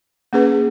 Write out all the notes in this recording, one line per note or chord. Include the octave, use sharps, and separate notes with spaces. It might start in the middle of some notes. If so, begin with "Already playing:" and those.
A#3 C#4 G#4 B4